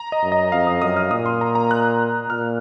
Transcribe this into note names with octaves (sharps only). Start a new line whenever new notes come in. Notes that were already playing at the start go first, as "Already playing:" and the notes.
Already playing: A#5
D#5
F#2
D#5
F2 F5
D#6
F#2 D#6
F6
A#2 D#6
C6
A#5
A#5
F#6
A#2 F6